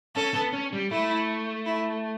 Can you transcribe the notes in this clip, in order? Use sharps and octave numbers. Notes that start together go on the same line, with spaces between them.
C#4 A4
B3
C#4
G3
A3 E4
E4